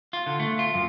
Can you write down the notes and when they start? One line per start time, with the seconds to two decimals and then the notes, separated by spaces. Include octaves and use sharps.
0.13 F4
0.26 D3
0.39 A3
0.59 F4
0.75 F#2